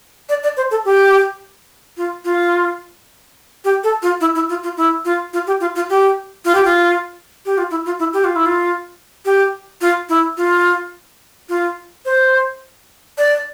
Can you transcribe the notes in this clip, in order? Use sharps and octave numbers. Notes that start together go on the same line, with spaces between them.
D5
D5
C5
A4
G4
F4
F4
G4
A4
F4
E4
E4
F4
F4
E4
F4
F4
G4
F4
F4
G4
F4
G4
F4
G4
F4
E4
F4
E4
G4
F4
E4
F4
G4
F4
E4
F4
F4
C5
D5